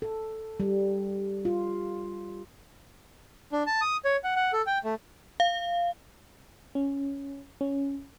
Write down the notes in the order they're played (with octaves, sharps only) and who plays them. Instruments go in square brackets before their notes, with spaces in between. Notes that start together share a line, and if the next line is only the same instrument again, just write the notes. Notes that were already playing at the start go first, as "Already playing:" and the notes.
[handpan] A4
G3
F4
[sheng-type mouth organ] D4
A5
D#6
C#5
F#5
F#5
A4
G5
A3
[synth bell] F5
[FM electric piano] C#4
C#4